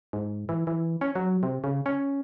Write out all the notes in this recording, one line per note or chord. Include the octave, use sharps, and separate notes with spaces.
G#2
E3
E3
C#4
F#3
C3
C#3
C#4